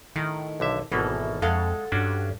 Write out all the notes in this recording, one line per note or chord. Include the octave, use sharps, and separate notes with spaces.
A2 D#3
B1 D3 E5
G#1 B2 E3 A#3 A4
F2 G#3 A4 F5 F#5
G2 C#4 D4 F#4